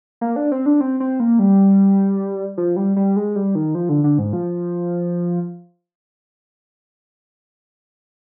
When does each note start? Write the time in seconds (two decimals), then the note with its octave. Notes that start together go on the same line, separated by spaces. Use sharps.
0.21 A#3
0.36 D4
0.52 C4
0.66 D4
0.81 C4
1.00 C4
1.20 A#3
1.39 G3
2.58 F3
2.76 G3
2.96 G3
3.16 G#3
3.36 G3
3.55 D#3
3.75 F3
3.89 D3
4.04 D3
4.18 G#2
4.33 F3